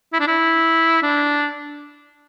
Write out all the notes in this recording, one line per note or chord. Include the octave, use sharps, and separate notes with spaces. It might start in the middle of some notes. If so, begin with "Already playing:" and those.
E4
D4
E4
D4